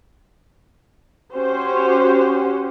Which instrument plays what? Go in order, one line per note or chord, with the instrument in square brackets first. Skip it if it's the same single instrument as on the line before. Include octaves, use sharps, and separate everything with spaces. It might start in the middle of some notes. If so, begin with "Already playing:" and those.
[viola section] C#4 F#4 G4 C5